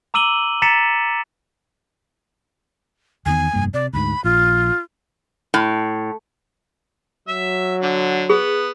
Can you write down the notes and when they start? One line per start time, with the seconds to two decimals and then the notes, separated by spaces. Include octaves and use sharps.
0.14 A#5 D6 E6 D#7 F#7 G7
0.62 A#5 A6 B6 C#7 E7
3.26 E2 D#3 B3 G#5
3.53 F1 G2 A#3
3.74 C3 D5
3.93 D2 G#2 B5
4.24 A#1 F4
5.54 A2
7.28 F#3 E5
7.82 D3
8.30 B3 G#4